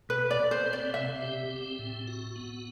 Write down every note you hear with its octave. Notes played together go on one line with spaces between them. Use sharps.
B2 B4
D5
B2
C5
C4
D5
C3 E5
G4
C4
A2
F#4
B3